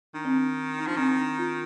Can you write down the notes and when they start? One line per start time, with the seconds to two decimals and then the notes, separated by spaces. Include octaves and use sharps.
0.14 D#3 D4
0.25 C4
0.36 D4
0.79 D#4
0.87 F3 D4
0.97 D#3 C4
1.18 D4
1.38 F4